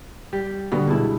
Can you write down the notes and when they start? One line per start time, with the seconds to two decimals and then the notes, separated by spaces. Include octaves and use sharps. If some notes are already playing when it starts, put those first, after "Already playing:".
0.33 G3
0.72 B2 D3 G3 B3
0.88 G2 B2 G#3 E4